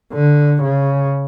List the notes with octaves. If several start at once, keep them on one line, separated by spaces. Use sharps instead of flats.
D3
C#3